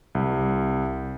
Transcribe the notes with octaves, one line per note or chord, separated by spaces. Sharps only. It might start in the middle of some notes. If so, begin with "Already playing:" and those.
C2